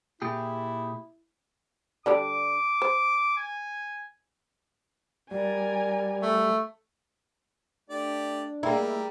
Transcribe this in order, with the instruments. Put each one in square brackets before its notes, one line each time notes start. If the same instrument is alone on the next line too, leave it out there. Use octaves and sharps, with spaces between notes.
[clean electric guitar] A#2 G4 G#4 [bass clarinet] E4
[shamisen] D3 G3 D4 [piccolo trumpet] D6
[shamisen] C5
[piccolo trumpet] G#5
[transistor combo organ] G3 [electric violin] A#4 G#5 [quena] D5
[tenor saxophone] A3
[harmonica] A3 G4 D5 [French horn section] D4
[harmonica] G3 A#4 [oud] A#3 E4 [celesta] G#4 G5 A#5